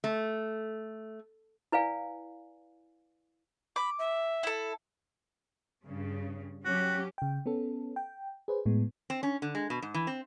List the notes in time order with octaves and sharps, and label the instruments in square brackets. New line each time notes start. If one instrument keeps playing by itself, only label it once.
[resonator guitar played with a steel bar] A3
[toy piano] E4 B4 D5 F5 G#5
[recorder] B5 [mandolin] D6
[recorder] E5
[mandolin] E4 A4
[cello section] G2 C#3
[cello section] F#3 C#4 G4 [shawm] F#4
[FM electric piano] C#3 G5
B3 C#4 A4
G5
G#4 B4 C5
A2 G#3 B3
[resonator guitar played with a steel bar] C4
C#4
D3
G#3
B2
G#2
E3
C4